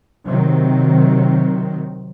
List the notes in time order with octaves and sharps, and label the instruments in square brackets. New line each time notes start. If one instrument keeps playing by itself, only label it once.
[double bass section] C3 D#3 F#3 C4